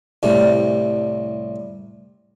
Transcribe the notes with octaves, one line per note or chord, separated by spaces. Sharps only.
C2 A2 G3